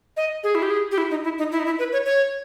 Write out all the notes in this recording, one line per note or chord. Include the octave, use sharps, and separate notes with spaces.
D#5
G#4
E4
G4
G#4
G4
E4
D#4
E4
D#4
E4
D#4
E4
B4
C#5
C#5